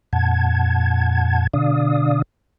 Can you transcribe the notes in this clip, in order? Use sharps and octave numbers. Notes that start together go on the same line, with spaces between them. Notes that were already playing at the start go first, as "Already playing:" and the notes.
F2 A#2 F#5 A5 G#6
B2 D3 D4 D5 F5 D#6